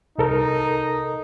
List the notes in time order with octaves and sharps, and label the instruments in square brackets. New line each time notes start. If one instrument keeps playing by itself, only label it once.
[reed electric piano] C2 A4 A#4 [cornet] D#4